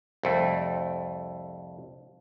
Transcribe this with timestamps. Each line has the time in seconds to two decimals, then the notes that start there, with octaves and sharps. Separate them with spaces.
0.23 C2 F2 A3